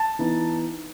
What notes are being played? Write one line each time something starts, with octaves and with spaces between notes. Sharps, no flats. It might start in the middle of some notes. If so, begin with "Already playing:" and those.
Already playing: A5
E3 B3 D#4